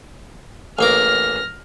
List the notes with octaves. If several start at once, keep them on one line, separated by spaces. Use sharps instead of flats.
A1 A#3 D6 F6 A#6